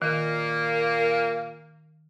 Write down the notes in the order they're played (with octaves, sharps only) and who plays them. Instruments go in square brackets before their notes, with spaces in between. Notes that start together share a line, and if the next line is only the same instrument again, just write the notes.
[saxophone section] A#2 A#3 [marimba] D#3